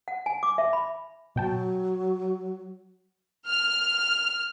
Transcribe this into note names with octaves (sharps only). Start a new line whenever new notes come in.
F#5
G#5
D6
E5
B5
B2 F#3 G5 A5
F6